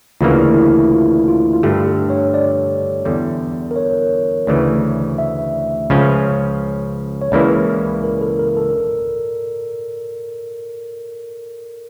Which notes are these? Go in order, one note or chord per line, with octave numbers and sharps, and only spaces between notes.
D2 C#3 E3 A#3 F4
E4
E4
F4
F4
F4
G2 D3 A3 G4
A4
C#5
D5
E2 D3 G3
A#4
C#5
D2 C#3 E3 A3 D5
E5
C#2 C#3 F3 C#4 F4
C#5
C#2 C#3 E3 A#3 E4 D5
A#4
A4
A#4
A4